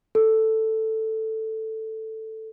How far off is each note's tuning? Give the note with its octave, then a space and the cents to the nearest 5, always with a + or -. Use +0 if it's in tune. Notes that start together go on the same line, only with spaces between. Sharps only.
A4 +5